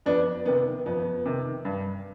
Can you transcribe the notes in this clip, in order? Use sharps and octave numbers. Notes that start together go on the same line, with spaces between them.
F2 B3 D4
C3 D#3 B3
F2 B3
C3 D#3
G2